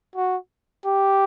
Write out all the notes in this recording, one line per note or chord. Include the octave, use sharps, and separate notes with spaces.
F#4
G4